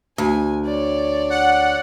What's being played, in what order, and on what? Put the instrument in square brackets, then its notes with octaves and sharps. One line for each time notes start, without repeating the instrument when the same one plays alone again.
[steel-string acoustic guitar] D2 [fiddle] G#5
[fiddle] C#5 D5
[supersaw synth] F#5